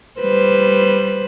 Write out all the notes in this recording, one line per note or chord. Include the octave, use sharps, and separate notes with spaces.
G3 B4 C5